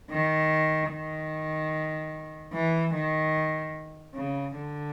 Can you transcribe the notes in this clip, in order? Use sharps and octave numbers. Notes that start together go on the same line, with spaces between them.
D#3
D#3
E3
D#3
C#3
D3